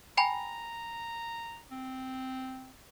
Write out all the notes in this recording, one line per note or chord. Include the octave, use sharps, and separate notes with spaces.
G5 G#5 A#5 B5
C4